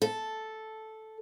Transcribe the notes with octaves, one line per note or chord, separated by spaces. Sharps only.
A4